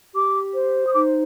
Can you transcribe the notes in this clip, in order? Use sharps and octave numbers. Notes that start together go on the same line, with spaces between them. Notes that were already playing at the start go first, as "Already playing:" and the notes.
G4 D6
C5
D#6
D#4 D6